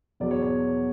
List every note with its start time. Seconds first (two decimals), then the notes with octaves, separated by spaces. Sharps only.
0.20 E2 B2 F#3 D5
0.31 C#5
0.42 C#5